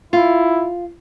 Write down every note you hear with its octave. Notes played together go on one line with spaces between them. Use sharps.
E4 F4